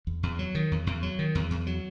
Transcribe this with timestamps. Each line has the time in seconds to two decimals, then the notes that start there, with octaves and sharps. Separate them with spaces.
0.07 E2
0.23 E2
0.39 F#3
0.55 D#3
0.71 E2
0.87 E2
1.03 F#3
1.19 D#3
1.35 E2
1.51 E2
1.67 F#3